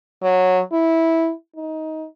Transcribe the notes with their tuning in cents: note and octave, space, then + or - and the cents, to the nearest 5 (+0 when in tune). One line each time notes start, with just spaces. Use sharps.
F#3 -10
E4 -10
D#4 +20